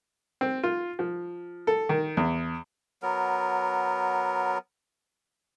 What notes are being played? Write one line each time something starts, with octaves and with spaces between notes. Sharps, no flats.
C4
F4
F3
A4
D#3
E2
F#3 B3 A#4